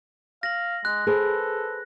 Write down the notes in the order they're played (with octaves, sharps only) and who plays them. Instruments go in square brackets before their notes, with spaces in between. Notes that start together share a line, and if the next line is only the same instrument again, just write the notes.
[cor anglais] F5 [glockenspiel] A#6 F#7
[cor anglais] G#3 [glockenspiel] F#6
[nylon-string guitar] G#4 B4 C5 [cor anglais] A4